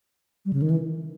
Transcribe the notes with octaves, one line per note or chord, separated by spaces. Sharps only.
G3
C#3
D#3
E3